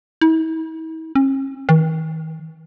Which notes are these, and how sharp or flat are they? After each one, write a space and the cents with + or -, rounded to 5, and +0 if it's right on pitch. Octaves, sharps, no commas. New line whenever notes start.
E4 -45
C#4 -40
D#3 +45